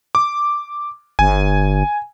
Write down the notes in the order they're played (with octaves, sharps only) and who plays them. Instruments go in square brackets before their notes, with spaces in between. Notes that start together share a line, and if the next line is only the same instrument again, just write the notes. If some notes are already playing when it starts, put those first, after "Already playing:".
[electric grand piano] D6
[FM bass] G1 [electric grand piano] G#5